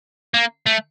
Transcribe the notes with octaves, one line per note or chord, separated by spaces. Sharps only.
A#3
A3